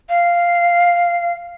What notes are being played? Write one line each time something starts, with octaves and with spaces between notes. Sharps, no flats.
F5